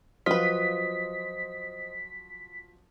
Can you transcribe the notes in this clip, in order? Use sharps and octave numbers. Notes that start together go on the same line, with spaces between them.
F3 F#3 F4 B4 C5 D#5 D#6 B6